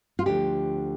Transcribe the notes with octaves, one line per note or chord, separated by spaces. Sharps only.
F4
D2 D3 F3 G4